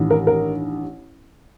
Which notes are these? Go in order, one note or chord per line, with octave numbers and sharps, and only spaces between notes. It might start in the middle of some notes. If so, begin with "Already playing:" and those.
Already playing: A1 G2 D#3
A#4
A#4